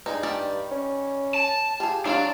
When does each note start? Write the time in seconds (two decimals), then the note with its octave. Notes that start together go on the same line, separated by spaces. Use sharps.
0.06 G2 D#4 G#4
0.23 D#3 G3 D5
0.71 C#4
1.34 A5
1.80 F4 G4 G#4
2.05 F#3 D4 F4 F5